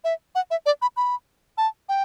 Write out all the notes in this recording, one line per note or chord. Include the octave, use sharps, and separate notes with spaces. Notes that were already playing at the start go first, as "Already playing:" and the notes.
E5
F#5
E5
D5
B5
B5
A5
G5